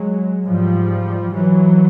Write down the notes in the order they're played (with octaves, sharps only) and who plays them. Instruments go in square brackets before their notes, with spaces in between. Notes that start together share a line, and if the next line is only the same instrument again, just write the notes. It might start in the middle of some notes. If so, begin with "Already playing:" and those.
Already playing: [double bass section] F#3 G#3
G#2 F3 G3
E3 F#3